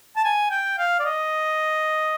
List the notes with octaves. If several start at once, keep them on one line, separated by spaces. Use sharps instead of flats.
A5
G#5
G5
F5
D5
D#5